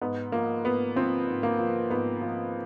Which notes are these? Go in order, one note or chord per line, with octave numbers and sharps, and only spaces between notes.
G#2 B3
F3 A#3
G#2 B3
F3 C4
G#2
A#3
F3
G#2 B3
F3